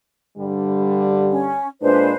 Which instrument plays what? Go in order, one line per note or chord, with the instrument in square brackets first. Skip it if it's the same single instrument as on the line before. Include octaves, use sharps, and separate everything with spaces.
[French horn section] G2 D3 G3
[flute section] C#4
[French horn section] A#2 G#3 D4 [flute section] B4 C5